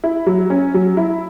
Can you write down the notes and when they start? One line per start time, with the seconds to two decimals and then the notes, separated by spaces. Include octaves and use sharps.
0.04 E4
0.27 F#3
0.50 C#4
0.74 F#3
0.97 E4